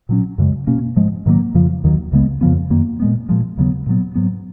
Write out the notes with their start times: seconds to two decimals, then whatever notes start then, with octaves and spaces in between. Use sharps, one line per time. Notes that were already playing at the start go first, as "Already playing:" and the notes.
0.09 A#2 F#3 C#4
0.38 F#2 C#3 G#3
0.67 B2 A#3 C#4
0.96 G#2 F3 G#3
1.26 G#2 D#3 F#3 A#3
1.54 F2 C#3 F3
1.84 D#2 D#3 F#3
2.12 C#2 C#3 G#3 B3
2.41 F2 C#3 F3 B3
2.70 F#2 D#3 A#3
3.00 A#2 G#3 B3
3.29 A#2 F3 G#3
3.57 D#2 C#3 F#3 B3
3.86 A#2 F#3 B3
4.15 G#2 F#3 B3